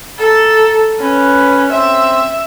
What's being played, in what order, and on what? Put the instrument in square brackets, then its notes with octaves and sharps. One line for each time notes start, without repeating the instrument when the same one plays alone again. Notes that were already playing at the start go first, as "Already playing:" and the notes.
[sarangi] A4 [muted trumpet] A#5
[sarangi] C#4 [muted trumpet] B4
[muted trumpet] C4 [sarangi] E5